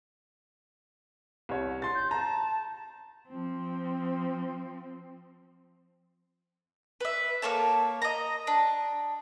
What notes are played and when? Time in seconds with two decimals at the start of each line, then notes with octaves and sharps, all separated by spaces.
1.49 C2 C#5
1.82 C6 A6
1.95 G6
2.11 A5 A#5
3.29 F3 C4
7.00 B4 E5
7.42 A#3 A4 C#5 A5
8.02 D#5 A#5
8.47 D4